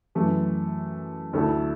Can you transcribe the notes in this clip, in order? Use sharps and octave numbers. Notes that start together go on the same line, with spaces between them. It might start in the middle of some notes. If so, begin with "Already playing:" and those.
F#2 E3 A3
D2 D3 A3 E4 A4